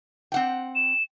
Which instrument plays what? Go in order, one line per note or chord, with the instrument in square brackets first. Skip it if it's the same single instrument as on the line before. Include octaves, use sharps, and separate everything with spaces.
[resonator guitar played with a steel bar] C4 F#5 G5
[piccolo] E7